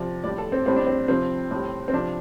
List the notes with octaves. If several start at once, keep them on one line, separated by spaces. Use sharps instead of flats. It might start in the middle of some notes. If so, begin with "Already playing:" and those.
Already playing: C3 F3 D5
A2 G3 D5
A4
C4
A2 G3 C4
D4
C4
C3 F3 C4
A2 G3
C4
C3 F3 D4